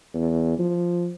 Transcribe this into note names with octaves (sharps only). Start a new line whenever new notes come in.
E2
F3